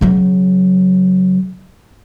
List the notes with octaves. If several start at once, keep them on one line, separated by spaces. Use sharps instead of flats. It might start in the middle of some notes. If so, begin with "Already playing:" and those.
C#3 F#3